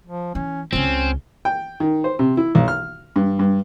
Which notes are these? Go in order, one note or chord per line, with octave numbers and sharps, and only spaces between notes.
F3
E3 C#4
C#2 C#3 C4 C#4
G5
D#3
C5
C3
E4
B1
F6
G2
G2